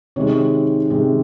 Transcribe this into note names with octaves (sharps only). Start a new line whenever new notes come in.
C3 D#3 G#3 C#5
C3 D#3 G#3